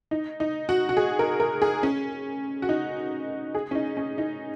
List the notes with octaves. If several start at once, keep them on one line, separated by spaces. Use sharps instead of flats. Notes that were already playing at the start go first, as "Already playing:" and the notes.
D#4
D#4
F#4
F#4
G#4
A#4
A#4
G#4
C#4
F#4
D#4
G#4
C#4
D#4
C#4
D#4